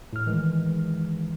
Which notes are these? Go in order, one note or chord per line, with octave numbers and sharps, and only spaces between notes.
A2 F6
D#3 E3 G#3